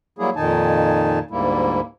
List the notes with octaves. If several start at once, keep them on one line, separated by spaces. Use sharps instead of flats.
F#3 G3 A#3 E4 G#4
F2 A#2 D#3 D#4 G#5 A5
D2 G#2 G3 A#3 E4